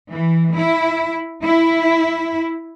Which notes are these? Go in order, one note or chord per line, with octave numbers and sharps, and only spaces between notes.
E3
E4
E4